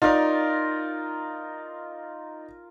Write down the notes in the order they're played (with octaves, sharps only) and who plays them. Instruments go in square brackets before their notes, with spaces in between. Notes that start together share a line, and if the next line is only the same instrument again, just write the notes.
[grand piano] D#4 D5 [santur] F4 A#4